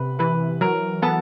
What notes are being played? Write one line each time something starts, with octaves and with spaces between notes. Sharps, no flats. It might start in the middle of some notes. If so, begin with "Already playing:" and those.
Already playing: C3 B4 B5
E3 B4 B5
F#3 A#4 A#5
B3 A4 A5